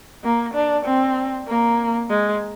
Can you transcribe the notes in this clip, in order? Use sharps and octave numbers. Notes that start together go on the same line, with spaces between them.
A#3
D4
C4
A#3
G#3